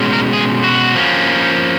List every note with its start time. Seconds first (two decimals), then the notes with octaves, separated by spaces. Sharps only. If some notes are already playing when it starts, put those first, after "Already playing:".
Already playing: B2 G#3 C#4
0.13 A#4
0.33 G#4
0.64 F#4
0.95 F3 A#3 C#4